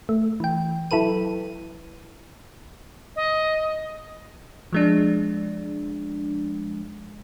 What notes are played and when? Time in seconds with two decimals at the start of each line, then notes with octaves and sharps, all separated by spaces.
0.09 A3
0.40 E3 G5
0.91 F#3 E4 A4 B4 D#7
3.16 D#5
4.73 F3 G#3 D4